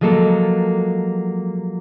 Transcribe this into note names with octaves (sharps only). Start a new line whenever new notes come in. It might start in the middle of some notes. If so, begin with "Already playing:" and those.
F3 F#3 G#3 A#3 A4